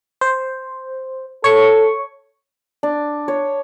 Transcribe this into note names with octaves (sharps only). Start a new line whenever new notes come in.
C5
A4 C#5 C#6
D4
C#5